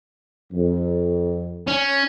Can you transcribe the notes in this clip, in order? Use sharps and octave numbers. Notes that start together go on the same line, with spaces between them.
F2
C#4